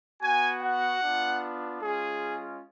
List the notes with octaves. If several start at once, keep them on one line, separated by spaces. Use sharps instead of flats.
B3 F#4 G#5
F#5
B3 D4 F4
G#3 C#4 F4 G#4